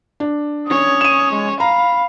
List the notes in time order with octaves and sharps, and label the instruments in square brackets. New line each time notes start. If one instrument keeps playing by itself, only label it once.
[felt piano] D4
[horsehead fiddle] C#4 C#5 [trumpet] D#6
[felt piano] D#7 E7
[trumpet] G#3
[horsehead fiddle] F5 [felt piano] A#5 [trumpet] B5